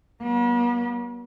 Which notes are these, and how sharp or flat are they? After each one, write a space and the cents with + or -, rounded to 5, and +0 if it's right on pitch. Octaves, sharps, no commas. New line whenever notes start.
F#3 +45 B3 -45